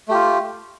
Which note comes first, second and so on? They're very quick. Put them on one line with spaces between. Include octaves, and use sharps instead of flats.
A3 G4 F4